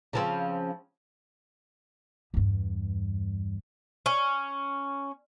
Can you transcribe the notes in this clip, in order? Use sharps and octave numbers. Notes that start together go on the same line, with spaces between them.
C#3 F3 C4
E2 G2
C#4